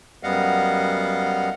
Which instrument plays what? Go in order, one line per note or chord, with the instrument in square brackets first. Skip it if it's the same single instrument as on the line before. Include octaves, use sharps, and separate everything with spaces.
[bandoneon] F#2 G3 B3 D#5 F5 F#5